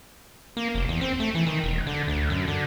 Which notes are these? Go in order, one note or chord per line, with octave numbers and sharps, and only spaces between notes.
A#3
F1
E2
C4
A3
E3
D#3
E1
D3
D2
F#2
D3